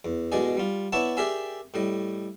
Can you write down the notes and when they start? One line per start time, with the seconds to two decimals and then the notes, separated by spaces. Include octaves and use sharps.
0.05 E2
0.32 A1 B2 G#3 D5 D#5 G#5
0.57 G3 F4
0.92 B3 E4 C#5 D5 A5
1.17 G4 G#4 A#4 D5 E5 G#5
1.74 A2 G3 D#5